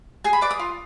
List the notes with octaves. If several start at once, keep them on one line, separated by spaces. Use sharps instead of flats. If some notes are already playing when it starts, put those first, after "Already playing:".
G#4 G#5
B5
B4 D5 D6
D#6
F4